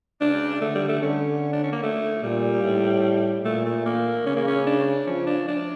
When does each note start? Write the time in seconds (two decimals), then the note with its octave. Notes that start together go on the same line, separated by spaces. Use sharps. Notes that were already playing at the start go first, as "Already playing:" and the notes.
0.21 C#3 D4
0.61 D3 A3
0.76 G3
0.89 A3
1.02 D3 C#4
1.53 D4
1.64 C#4
1.72 A#3
1.83 A3
2.23 A#2 G3
2.63 A2
3.45 A#2 A3
3.66 A3
3.86 A#3
4.26 C#3 C#4
4.36 A#3
4.47 C#4
4.67 D4
5.07 F3 C#4
5.27 D4
5.48 D4